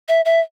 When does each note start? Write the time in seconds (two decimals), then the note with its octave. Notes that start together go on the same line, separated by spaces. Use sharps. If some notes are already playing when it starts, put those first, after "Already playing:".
0.08 E5
0.25 E5